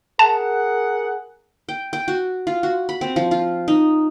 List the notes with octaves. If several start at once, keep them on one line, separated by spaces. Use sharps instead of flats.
G#4 A#4 F#5 A5
G5
G5
F#4
F4
F#4
B5
C4
F3
F4
D#4